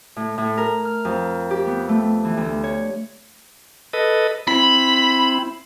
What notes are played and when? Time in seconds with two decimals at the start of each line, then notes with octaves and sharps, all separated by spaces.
0.16 A2
0.38 A2
0.58 A#4
0.85 F6
1.05 F2
1.51 G4
1.67 B3
1.89 A3
2.24 E3
2.37 D2
2.63 C#5
3.93 A4 B4 D#5
4.48 C4 E4 B5